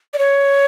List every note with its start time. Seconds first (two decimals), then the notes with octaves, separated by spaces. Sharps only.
0.14 D5
0.18 C#5